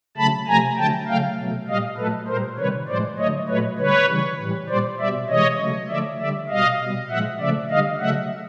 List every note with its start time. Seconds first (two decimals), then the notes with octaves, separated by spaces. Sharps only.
0.17 C#3 F#3 A3 A5 B5
0.48 C3 F3 A3 G#5 A#5
0.77 D3 F#3 A3 G5 A5
1.07 C#3 F#3 A3 F5 G5
1.38 B2 F#3 A3
1.68 A#2 G3 D#5 F5
1.98 A#2 F#3 A3 A4 B4
2.28 A#2 G3 A#4 C5
2.58 C3 D#3 G3 B4 C#5
2.88 A2 F3 G#3 C5 D5
3.18 D3 F#3 A3 C#5 D#5
3.48 A#2 F#3 A3 B4 C#5
3.78 D3 G3 B4 C#5
4.08 C#3 E3 G3
4.39 A2 E3 G3
4.68 A#2 G3 C5 D5
4.99 B2 G3 D5 E5
5.29 C3 E3 G#3 C#5 D#5
5.60 C#3 F#3 A3
5.89 D3 F3 A3 D5 E5
6.20 D3 G3 D5 E5
6.49 B2 G3 D#5 F5
6.80 B2 G3
7.09 A#2 F3 G#3 E5 F#5
7.40 C#3 F3 A3 D5 E5
7.70 D3 G3 D#5 F5
8.00 C#3 F#3 A3 E5 F#5